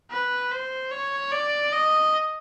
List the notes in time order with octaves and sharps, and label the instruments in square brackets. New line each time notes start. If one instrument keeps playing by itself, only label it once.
[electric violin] B4
C5
C#5
D5
D#5